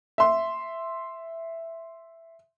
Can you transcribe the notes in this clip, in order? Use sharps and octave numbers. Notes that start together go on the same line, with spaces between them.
E5 C6